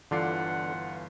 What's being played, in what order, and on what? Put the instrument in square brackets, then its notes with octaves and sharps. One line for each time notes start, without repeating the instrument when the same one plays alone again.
[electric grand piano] G1 F4 C7 [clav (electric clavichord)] D3 D5 [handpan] E3 [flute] F#5